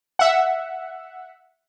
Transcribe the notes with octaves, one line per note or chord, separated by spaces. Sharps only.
E5 F#5